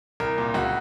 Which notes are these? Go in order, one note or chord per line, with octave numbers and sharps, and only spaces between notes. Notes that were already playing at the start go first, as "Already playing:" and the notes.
C2 A#4
A#2
C#2 F#4